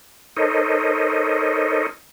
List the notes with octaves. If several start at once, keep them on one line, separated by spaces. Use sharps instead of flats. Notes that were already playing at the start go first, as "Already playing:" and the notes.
D#4 A4 A#4 C5 C#5 D#5